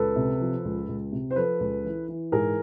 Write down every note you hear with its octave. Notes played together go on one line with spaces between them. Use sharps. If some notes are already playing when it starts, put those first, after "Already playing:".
Already playing: C#2 A4 B4
C3
F3
C#2
C#2
C3
C5
F3 A4 B4
C#2
E3
E3
G#2 G#4 A#4